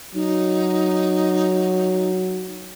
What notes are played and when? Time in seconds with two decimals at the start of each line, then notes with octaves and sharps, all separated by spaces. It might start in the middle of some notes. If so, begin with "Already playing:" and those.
0.15 F#3 D#4